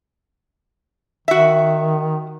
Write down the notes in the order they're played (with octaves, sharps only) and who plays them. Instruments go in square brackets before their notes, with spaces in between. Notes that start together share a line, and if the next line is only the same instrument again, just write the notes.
[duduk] D#3 [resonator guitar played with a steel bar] F#4 E5